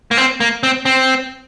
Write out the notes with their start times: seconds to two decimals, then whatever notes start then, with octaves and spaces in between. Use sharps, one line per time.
0.11 A#3
0.17 C4
0.40 A#3
0.63 C4
0.85 C4